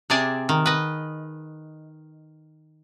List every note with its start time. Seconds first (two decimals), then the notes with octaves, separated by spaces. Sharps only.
0.10 C3 C4 G#4 D5 G#5 A5
0.49 D#3
0.66 B4 D#5